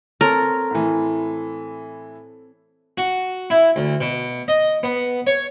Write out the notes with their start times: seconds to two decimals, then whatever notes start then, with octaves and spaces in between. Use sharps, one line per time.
0.21 C4 A4 A#4 C#5
0.71 A2 E3
2.98 F#4
3.50 E4
3.76 D2
4.01 B2
4.48 D#5
4.83 B3
5.27 C#5